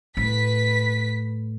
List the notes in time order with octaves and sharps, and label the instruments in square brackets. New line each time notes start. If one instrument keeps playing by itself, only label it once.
[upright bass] A2 [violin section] B4 B6